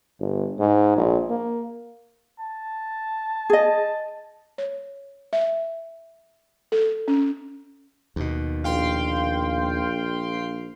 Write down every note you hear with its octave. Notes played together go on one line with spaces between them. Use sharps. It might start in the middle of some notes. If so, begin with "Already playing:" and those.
G1
G#2
A#1
A#3
A5
G#4 D#5
C#5
E5
A4
C#4
D#2 B2
A#1 F5 G5 C6